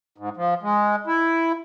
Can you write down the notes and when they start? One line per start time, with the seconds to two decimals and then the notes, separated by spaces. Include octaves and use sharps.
0.18 G#2
0.37 F3
0.62 G#3
1.07 E4